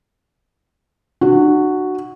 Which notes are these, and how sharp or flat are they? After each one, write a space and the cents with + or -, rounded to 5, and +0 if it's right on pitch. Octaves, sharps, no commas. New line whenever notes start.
D4 +40 F#4 +0